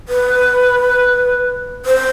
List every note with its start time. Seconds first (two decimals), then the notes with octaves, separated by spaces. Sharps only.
0.09 B4
1.86 C5